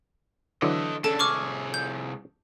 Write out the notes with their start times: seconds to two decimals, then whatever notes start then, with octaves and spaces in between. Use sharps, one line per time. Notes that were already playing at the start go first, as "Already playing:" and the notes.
0.62 D3 E3 F#3 A4 D#5
1.04 C#3 D4 A4 A5
1.19 C2 G#4 C#6 D6 F6
1.74 G6